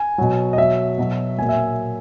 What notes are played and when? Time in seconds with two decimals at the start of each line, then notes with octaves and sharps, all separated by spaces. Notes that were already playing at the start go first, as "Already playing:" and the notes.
Already playing: G#5
0.18 B2 F#3
0.53 D#5
0.58 B2 F#3 E5
0.98 B2 F#3
1.38 A#2 F#3 G#5
1.49 E5